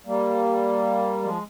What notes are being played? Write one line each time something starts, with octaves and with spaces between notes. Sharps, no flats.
G3 A#3
F3 G#3